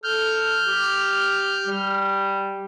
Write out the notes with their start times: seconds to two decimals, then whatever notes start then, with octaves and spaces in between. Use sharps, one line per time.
0.04 A4 F6 G6
0.68 G4
1.67 G3